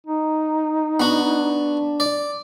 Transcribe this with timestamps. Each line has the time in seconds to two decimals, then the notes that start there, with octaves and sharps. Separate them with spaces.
0.07 D#4
1.00 B3 D4 F#4
2.00 D5